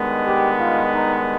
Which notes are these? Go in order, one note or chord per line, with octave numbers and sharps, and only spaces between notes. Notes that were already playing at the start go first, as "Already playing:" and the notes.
Already playing: G2 D#3 G#3 B3
G4
F4
D#4